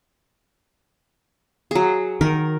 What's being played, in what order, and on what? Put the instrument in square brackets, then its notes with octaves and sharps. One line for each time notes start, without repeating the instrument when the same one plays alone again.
[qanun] F#3 G#4
[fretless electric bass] D#3 [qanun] A#4